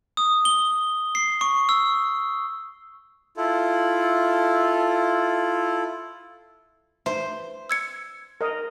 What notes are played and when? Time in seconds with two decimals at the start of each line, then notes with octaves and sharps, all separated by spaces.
0.17 D#6
0.45 G7
1.15 C7
1.41 C#6
1.69 E6
3.37 E4 F4 A4
7.06 C5 E5
7.70 E6 G#6 C#7
8.41 A#4 D#5